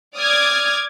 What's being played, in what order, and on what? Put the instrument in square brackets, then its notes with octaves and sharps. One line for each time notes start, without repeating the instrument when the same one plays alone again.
[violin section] D5 D6 D#6 F6 G#6